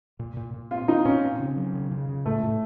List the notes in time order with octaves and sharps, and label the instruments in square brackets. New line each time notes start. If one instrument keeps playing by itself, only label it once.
[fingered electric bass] A#2
A#2
A#2
[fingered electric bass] C4 [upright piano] F4
[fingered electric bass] C4 [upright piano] D#4
[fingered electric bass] A#2 [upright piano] C#4
[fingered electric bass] C4
C#3
F#3
C#3
C#3
C#3
[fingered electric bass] A2 [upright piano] A3
[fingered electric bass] A2